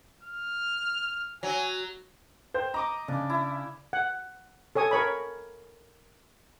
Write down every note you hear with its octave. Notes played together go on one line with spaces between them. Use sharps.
F6
F#3 G#5
C5 G5 G6
D#5 A#5 D6 D#6
C#3 D4
E4
F#5
A4 C#5 G#5 D#6
A#4 C#5 B5